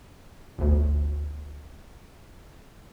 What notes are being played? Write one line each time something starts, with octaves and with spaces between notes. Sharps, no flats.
G1 D2